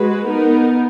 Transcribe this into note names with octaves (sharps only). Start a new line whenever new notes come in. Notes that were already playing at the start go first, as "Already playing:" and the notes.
Already playing: G#3 F#4 B4
B3 D#4 A#4